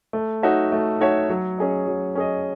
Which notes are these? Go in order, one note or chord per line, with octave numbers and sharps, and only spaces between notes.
A3
D#4 F#4 C#5 E5
A3
D#4 F#4 C#5 E5
F#3
C#4 G#4 D#5
F#3
C#4 G#4 D#5